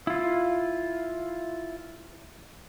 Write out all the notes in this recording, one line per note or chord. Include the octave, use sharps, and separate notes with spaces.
E4 F4